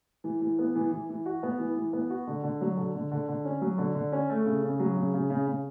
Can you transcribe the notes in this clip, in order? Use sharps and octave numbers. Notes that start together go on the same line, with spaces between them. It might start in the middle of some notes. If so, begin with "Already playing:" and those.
E3
E3
B3
E3
E3
E3
F#4
B3
E3
E3
B3
F#4
D3
D3
F#3
D3
D3
D3
D3
C#4
F#3
D3
D3
C#4
A3
C#3
C#3
F#3
C#3
C#3
C#3
C#3